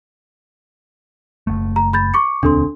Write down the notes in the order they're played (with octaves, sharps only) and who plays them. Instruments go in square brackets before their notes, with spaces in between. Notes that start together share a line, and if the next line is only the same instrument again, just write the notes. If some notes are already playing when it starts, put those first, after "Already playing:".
[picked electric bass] F#1 A3
[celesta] A#5
B5 G6 A6
C#6 D6 C#7
[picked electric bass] E1 D2 C4 [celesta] D4 A4 C6